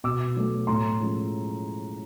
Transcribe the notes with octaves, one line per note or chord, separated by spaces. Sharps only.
B2 D6 E6
F#3 A3
A2 A#5 C6
F3 G#3 C#4